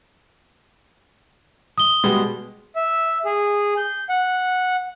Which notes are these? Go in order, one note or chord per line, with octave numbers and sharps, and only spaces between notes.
D#6 G7
B2 G3 G#3
E5
G#4
G6
F#5